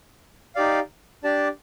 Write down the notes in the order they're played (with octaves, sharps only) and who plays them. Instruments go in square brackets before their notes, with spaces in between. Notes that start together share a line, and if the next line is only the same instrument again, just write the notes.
[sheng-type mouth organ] D#4 G4 D5 F5
D4 G4 D5 A5